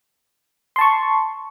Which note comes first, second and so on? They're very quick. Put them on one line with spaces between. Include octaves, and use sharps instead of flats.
C6 A5 C#6